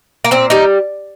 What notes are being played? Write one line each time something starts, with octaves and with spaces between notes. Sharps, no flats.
A#3
A#2 C4
G3 D#4